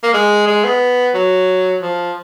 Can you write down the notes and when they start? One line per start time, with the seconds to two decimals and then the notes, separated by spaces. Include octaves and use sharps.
0.03 A#3
0.14 G#3
0.47 G#3
0.64 B3
1.14 F#3
1.82 F3